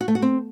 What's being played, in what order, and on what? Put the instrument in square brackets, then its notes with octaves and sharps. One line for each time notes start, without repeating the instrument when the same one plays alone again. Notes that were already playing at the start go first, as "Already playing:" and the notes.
[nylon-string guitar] F#4
A3
F#4
C4